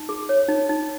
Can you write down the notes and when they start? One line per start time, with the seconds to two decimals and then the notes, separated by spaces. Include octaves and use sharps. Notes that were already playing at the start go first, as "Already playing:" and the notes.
Already playing: D#4
0.09 G#4
0.29 C#5
0.49 D#4
0.69 D#4